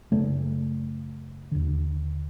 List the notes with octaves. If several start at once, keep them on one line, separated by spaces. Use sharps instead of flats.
F#2 C#3 A3
D#2 D3